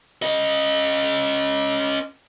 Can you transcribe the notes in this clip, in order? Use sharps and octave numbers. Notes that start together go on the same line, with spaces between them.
C#4 D#5